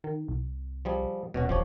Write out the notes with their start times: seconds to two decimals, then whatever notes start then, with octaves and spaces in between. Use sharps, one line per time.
0.04 D#3
0.28 C2
0.85 F3 G3 G#4
1.34 D#1 B2 C#4 F#4
1.49 D#1 F3 G4 C#5